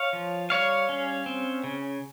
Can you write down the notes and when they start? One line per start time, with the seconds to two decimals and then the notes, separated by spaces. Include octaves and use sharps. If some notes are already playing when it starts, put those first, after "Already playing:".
Already playing: C#5 F5
0.13 F3
0.50 G3 C#5 F5
0.89 C#4
1.26 C4
1.64 C#3